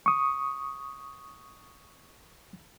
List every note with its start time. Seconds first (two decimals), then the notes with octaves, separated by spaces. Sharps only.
0.06 C#6 D#6